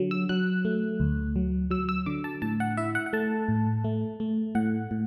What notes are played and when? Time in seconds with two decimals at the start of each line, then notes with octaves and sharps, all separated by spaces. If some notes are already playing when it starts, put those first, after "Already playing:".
Already playing: D3 F#3
0.11 E6
0.29 F#3 F#6
0.65 A3
1.00 D2
1.36 F#3
1.71 F#3 E6
1.89 E6
2.06 D3 D6
2.24 A5
2.42 A2 A5
2.60 F#5
2.77 E4 E5
2.95 F#5
3.06 F#5
3.13 A3 A5
3.48 A2
3.84 A3
4.20 A3
4.55 A2 F#5
4.91 A2